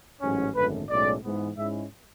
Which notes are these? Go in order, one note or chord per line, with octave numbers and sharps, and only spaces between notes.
A1 G#2 F#3 C#4
G#1 F#2 D3 A3 B4
B1 A2 G#3 C#4 D5
G#2 E3 B3
G#2 G#3 C#4 E4 E5